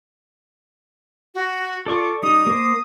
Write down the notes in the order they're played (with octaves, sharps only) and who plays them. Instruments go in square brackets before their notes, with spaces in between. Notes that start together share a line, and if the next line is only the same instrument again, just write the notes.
[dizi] F#4
[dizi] F4 [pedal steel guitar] A4 D5 C#6
[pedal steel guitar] G3 D#4 [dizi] D#6
[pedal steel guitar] A#3 C5